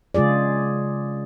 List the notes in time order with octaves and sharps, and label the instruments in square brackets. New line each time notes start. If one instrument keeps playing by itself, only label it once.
[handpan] C#3 G#3 F4 G#4 D5